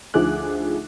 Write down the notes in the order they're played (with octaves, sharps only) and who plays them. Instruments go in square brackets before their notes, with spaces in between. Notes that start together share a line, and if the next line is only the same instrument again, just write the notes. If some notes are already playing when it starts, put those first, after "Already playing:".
[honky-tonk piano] D2 F3 D#4 G#4 D6 F#6